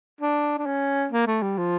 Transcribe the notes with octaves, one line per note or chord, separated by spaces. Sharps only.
D4
D4
C#4
A#3
A3
G3
F3